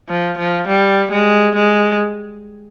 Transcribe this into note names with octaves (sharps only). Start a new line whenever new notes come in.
F3
F3
G3
G#3
G#3